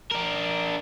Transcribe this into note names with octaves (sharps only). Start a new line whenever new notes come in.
D4 A#4